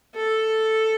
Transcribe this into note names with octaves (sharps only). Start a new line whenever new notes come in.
A4